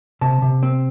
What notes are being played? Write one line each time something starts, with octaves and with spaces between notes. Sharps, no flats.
C3 A5
C3
C4